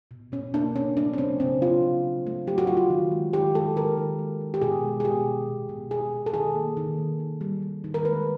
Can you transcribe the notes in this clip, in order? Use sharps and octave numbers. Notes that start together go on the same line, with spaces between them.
B2
B2 C#4
A#3 D4
B2 C#4
F#3 D4
C4
C#3 C#4
C#3 C4
F#3 F4
C#3
F#3
A3
F#3 G4
F#4
A3 F4
F#4
D#3
G#3
D#3 G4
G#3 A4
D#3 A#4
D#3
G#3
D#3
G4
B2 G#4
G#3
G#4
B2 G4
G#3
B2
B2
B2 G#4
B2
A4
D#3 G#4
A#3
D#3
A#3
D#3
G3
G3
D#3
A#4
G#3 B4